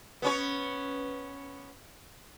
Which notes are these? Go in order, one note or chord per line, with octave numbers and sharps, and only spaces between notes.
B3 C#4 C#5